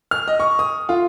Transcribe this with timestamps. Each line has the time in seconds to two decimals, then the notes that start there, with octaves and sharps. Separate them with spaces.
0.11 F6
0.28 D#5
0.40 C#6
0.59 D#6
0.89 F4